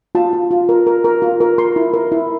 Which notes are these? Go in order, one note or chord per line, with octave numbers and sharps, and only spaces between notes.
F4 A5
F4
F4
A#4
A#4
A#4
F4
A#4
A#4 C6
E4
A#4
E4